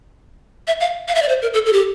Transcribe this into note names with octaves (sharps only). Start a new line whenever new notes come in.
E5
F5
F5
E5
D5
C5
A#4
A4
A4
G4